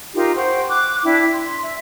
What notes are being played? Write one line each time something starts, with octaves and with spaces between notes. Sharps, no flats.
D#4 F4 G4 A#4
C5 F#5 G5 C#6
D6 F#6
D4 E4 G5
C6
E5